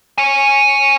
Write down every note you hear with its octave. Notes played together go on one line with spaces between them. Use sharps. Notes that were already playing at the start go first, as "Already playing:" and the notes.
C#5 G#5